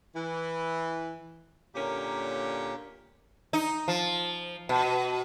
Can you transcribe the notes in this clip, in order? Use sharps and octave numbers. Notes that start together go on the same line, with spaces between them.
E3
A#2 D3 C#4 G4 A#4 C#5
D#4
F3
B2